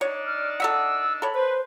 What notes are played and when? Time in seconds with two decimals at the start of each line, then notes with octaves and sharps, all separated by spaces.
0.01 D4 D#4 C#5 D5
0.26 F6
0.60 A4 E5 F#5 E6
1.22 A4 C#5 B5
1.35 B4 C5